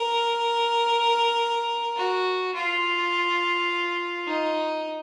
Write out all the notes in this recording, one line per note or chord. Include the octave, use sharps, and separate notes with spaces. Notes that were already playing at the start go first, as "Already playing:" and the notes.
Already playing: A#4
F#4
F4
D#4